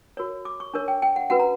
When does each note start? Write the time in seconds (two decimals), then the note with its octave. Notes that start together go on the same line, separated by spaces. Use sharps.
0.17 F#4 A#4 C#5
0.45 D6
0.60 C#6
0.74 D4 A#4 C#5
0.88 G5
1.02 G5
1.16 F#5
1.30 C#4 F#4 B4 F#5
1.39 A#5